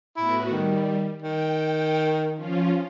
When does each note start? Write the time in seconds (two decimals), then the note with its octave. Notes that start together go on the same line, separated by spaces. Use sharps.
0.17 A2 B3 E4 F#4
0.51 D#3 G3
1.22 D#3 G5
2.34 F3 C#4 F4